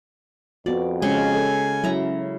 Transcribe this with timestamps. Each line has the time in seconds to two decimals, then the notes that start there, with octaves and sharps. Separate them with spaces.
0.66 F2 B3 F#4 D5
1.02 C#3 G#3 C#4 G#5
1.35 A4
1.84 F#3 C#4 E4 A#5